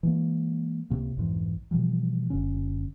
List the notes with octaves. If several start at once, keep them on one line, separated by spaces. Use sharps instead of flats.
E3 G#3 A#3
C#2 C3 A#3
B1 F2 G#2 E3
B2 E3 F3 G3
F#1 F#2 D3 C#4